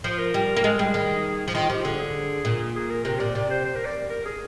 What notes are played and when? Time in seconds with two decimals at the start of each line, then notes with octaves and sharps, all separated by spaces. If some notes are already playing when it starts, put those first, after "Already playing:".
0.04 F3 C5
0.18 A#4
0.34 G3
0.56 A#3
0.64 G#3 A#4
0.79 G3 G#4
0.94 D#3
1.48 F3
1.54 D#3 F4
1.70 F3 G4
1.84 D3 G#4
2.00 G#4
2.45 A#2
2.75 G#4
2.90 A#4
3.05 C3 A#4
3.20 A#2 D5
3.35 C3 D5
3.50 C5
3.65 C5
3.76 A#4
3.85 D5
4.10 A#4
4.25 G#4